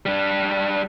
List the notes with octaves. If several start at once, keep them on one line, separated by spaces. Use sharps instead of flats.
G3 D4